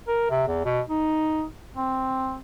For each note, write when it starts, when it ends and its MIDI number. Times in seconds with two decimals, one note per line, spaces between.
0.08 0.26 70
0.30 0.45 48
0.48 0.62 40
0.65 0.81 47
0.89 1.44 63
1.75 2.38 60